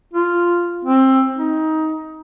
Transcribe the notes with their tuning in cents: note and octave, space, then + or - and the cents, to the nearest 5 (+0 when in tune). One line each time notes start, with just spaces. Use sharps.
F4 -5
C4 +20
D#4 +20